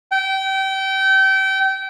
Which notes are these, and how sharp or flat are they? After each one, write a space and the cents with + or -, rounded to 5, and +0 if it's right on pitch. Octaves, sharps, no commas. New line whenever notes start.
G5 -30